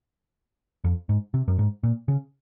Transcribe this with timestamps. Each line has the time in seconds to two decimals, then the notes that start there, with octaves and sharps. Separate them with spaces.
0.84 F2
1.09 G#2
1.34 C3
1.48 F#2
1.59 G#2
1.83 A#2
2.08 C#3